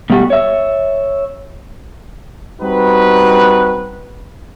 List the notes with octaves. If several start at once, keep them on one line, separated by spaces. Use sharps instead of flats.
B2 G3 A3 F#4 G4
C#5 E5
G3 C4 D#4 F#4 B4